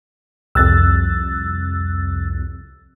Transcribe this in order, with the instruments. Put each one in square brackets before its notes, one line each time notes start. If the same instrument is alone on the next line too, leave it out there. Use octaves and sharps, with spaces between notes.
[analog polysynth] C2 F2 [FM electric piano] E6 F#6 A6